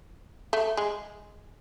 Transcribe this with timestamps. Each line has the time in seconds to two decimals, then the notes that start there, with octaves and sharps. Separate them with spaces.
0.53 A3
0.77 G#3